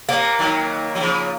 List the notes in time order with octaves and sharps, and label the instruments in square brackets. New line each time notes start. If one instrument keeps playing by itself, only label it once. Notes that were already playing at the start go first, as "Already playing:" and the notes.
[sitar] C3 [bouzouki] A#3
[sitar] D#3 F#3
F#3
C#3 F3